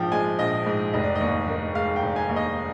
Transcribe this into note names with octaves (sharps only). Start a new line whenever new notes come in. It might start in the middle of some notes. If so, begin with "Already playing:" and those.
Already playing: A#1 G#2 F3 G5
G#3 G#5
A#1 D#5
G#2
F1 D#5
D5
D#5
D#2
D#3
G#3 F5
G5
F1
G#5
D#2
D#5